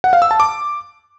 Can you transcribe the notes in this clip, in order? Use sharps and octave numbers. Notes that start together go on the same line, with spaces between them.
F#5
F5
E6
A5
D6